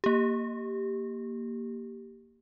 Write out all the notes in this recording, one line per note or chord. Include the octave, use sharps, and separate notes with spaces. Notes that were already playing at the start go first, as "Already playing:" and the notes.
A#3 G4